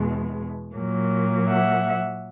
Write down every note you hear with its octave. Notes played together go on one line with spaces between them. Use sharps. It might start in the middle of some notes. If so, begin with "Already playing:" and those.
Already playing: E2 B2 G#3
A#2 F#3 A#3
E5 F#5